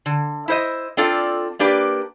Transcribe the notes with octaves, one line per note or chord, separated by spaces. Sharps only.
D3
E4 C5 D#5
C4 D4 F4 A4 D5
A#3 D4 G4 B4 D5